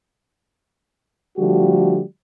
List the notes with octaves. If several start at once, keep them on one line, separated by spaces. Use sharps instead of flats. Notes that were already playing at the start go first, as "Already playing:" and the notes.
D3 F3 G3 A3 F#4 G4